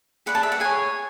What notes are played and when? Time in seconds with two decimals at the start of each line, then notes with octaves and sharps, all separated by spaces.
0.26 G#4 B4 D5 F#5
0.35 A5
0.43 E5
0.52 F#5
0.60 G#4 C#5 G#5